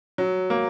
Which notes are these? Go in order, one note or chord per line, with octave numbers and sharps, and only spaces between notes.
F#3
A#3